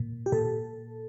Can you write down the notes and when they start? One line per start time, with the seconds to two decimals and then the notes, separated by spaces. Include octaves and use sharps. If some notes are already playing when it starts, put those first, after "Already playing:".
Already playing: A#2
0.26 G4
0.32 A#2 A4